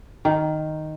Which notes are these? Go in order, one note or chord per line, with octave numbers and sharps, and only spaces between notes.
D#3